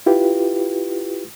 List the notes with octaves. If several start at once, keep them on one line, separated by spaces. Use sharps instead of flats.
E4 F4 G4 B4